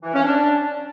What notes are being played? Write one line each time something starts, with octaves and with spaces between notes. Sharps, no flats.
E3
C#4
D4